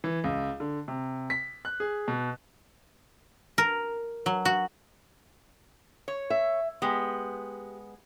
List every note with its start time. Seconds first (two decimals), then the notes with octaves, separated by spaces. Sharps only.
0.04 E3
0.24 C#2
0.60 D3
0.88 C3
1.30 B6
1.65 F#6
1.80 G#4
2.08 B2
3.58 A#4
4.26 F#3
4.45 F#4
6.08 C#5
6.30 E5
6.82 G#3 B3 G4